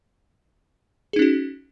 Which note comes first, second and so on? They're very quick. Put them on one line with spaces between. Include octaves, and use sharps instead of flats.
G#4 D#4 C#4 F#4